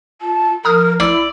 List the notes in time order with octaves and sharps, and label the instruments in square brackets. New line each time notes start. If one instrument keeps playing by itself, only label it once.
[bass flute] F4 [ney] A5
[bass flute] F3 [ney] A#4 [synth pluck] A#5 D#6 F6
[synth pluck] A1 E6 [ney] E4 [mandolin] D5